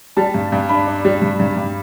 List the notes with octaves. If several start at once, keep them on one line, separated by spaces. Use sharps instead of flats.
G3 A5
G2
G2
D4 B5
D4
G3
G2
G2
G2